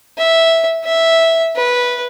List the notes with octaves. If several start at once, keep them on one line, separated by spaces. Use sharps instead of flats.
E5
E5
B4